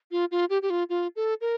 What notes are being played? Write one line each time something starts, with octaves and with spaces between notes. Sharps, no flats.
F4
F4
G4
G4
F4
F4
A4
A#4